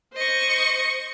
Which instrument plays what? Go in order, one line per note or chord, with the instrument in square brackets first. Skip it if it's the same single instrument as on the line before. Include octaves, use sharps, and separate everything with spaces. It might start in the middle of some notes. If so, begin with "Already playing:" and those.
[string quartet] C5 D#5 C#6